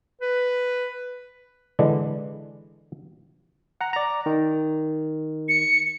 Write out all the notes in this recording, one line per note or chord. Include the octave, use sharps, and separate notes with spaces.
B4
D3 E3 G#3 D4
F#5 A#5
D5 A#5
D#3
C#7